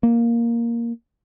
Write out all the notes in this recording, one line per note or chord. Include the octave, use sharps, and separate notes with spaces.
A#3